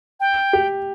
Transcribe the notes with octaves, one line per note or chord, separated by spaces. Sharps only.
G5
G4